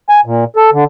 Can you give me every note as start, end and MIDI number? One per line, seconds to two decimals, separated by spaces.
0.09 0.20 80
0.25 0.45 46
0.56 0.70 69
0.73 0.84 50